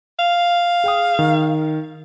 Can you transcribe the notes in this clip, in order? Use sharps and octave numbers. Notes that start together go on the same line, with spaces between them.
F5
G#4 G5 D#6
D#3